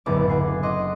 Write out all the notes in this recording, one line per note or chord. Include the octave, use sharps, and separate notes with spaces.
F#1 C#2 A2 D3 B3 D6
F#5 G#5 C7
D#5 F#5 C6 D6